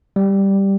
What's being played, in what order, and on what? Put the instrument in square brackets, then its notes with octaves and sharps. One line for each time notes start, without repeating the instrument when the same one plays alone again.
[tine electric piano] G3